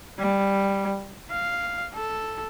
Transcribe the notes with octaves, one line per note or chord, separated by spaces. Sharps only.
G3
F5
A4